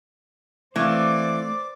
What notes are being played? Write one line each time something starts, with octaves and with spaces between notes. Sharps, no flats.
E3 A3 C4 C5 D5 F5 D6